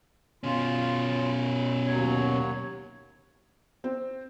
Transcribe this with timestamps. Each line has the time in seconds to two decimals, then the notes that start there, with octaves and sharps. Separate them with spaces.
0.44 B2 C#4 F4
1.87 D#2 F#3 C#5
3.84 C4